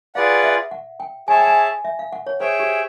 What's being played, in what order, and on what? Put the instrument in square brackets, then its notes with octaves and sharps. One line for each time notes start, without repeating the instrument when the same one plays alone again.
[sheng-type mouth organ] F4 G#4 B4 D5 F#5 [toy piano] F5
[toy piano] E5
F#5
G5
[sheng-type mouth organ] G#4 C#5 E5 A5 [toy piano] G#5
[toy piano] G5
G#5
E5
F5
F#5
C#5
[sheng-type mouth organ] G#4 C#5 E5 G5 [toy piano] C5
[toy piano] G4